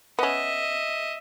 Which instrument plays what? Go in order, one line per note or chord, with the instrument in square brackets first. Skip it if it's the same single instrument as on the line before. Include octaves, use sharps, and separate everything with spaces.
[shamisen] B3 C#4 [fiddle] D#5 E5